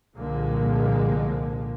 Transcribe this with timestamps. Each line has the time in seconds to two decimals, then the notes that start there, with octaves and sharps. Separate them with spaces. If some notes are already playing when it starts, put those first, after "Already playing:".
0.16 C2 A#2 D3 F3 G#3 A#3